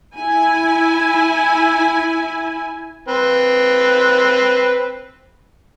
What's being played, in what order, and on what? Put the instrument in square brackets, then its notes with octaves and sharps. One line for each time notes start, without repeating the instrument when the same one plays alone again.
[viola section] E4 G#5
[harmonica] C4 B4